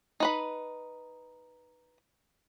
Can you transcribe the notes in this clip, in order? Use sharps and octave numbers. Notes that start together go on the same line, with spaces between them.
D#4 B4 B5